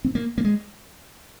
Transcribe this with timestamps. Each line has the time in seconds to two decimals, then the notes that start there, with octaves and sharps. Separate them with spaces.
0.04 C4
0.15 A#3
0.38 A#3
0.44 G#3